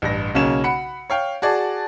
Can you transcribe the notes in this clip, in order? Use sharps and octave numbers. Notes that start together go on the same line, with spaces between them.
A1 G2 A#6
B1 C#3 A#3 C#4 E7
F#5 B5 C#7
C#5 F5 G5
F#4 G#4 D5 A5